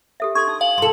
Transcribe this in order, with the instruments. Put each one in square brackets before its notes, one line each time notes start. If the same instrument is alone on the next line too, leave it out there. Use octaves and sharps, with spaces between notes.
[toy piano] G4 A4 E5
[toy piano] D4 A4 C6 [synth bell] C#6 [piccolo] G#6
[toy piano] D#4 [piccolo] D#6
[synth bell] F5 [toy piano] G#5 [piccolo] F#7
[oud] G2 A4 [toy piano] C6